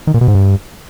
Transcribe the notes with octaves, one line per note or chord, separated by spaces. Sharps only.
D#3
A#2
B2
G#2
G2